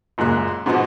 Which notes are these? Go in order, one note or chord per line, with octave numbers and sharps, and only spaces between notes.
F#1 F#2 A#2 G#3 F#6
G#2 B2 F3 B3 D#4 F#4